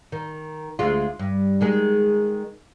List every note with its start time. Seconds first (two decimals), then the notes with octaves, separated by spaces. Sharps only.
0.12 D#3
0.79 D2 G#3 F4
1.19 G2
1.61 D#3 G#3 G#4